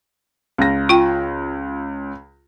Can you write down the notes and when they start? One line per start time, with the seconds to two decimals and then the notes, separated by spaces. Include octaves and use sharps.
0.58 C#2 A#6
0.89 F4 G5